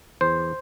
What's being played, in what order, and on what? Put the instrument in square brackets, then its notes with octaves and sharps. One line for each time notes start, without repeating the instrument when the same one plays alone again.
[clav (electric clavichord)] E2 C5